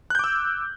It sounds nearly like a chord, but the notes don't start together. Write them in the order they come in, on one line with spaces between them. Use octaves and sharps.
F#6 G6 D6 E6